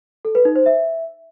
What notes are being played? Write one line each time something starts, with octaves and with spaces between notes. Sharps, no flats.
A4
B4
D#4
C5
E5